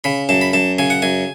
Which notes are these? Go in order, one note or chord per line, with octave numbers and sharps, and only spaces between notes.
C#3 B5
F#2 A5
B5
F#2 A5
C#3 G#5
F#5
F#2 G#5